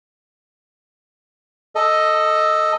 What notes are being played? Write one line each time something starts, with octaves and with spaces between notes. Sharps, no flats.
A4 D#5